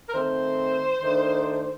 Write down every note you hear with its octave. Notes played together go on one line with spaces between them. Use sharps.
A#4
D#3 A3 C4 C5
D#3 A3 D4